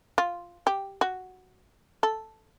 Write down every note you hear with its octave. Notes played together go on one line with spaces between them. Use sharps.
F4
G4
F#4
A4